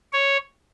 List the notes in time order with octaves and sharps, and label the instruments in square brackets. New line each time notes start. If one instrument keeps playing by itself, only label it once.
[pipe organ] C#5